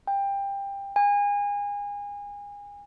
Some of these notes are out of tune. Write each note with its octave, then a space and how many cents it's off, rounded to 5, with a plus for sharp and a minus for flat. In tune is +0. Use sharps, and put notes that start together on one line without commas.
G5 +20
G#5 -30